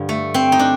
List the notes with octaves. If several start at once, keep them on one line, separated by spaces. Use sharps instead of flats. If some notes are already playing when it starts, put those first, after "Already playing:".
Already playing: G2 D3 F3
A3
C4
D#4
D4